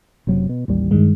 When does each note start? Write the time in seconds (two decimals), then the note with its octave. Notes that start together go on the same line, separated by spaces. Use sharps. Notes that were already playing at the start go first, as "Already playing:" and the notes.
0.27 F#1 C3 F#3
0.49 B2
0.68 A1 D#2 G3
0.91 G2 D#3 G#3